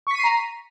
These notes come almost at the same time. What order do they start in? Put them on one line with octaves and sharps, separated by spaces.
C#6 B6 D#7 C7 A#5